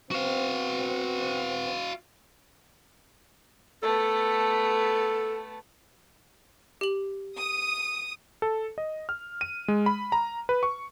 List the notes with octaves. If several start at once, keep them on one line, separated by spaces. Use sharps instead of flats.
B3 C4 F#4 F5
A3 B3 A4
G4 F#7
D#6
A4
D#5
F6
D#7
G#3
B5
A#5
B4
C#6